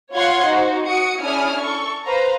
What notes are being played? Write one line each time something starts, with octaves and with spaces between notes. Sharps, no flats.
F4 C#5 F5 F#5 C6 G#6
D#4 F#4 C5
F#4 D#6 C#7
C#4 D4 E4 G#4 D#6 F6
A4 C#6
B4 C5 F5 A#5